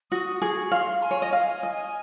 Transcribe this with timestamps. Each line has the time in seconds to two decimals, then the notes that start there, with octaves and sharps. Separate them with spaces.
0.11 F#4 D#6
0.42 G#4 C#6
0.72 F5 C6
1.02 G#5
1.11 C#5
1.22 D#5
1.33 F5
1.63 D#5